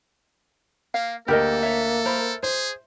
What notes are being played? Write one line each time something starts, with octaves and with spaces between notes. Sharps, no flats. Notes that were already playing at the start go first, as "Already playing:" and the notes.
A#3 F5
D2 A#3 G4 A4 A#4 D#5
C#5 E5
A#4 C5 B5
G#4 C5